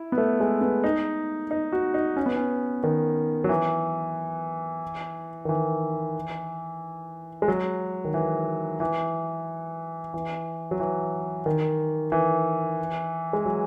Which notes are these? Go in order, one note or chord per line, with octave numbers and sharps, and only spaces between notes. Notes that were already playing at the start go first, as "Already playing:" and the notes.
Already playing: E4
B3
A3
G#3
B3
D#4
D#4
F#4
D#4
C#4
B3
C#4
D#3
F#3
E3
D#3
E3
G#3
F#3
D#3
E3
E3
E3
F#3
E3
D#3
E3
G#3
F#3